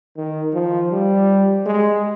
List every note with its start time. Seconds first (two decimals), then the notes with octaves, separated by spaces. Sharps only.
0.17 D#3
0.54 F3
0.92 G3
1.66 G#3